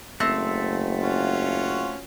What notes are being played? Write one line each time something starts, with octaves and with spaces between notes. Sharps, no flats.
F#1 A3 C4
C#4 F4 F#4